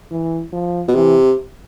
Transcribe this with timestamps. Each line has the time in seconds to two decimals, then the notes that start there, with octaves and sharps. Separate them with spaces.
0.11 E3
0.53 F3
0.88 B2
0.95 C3 E3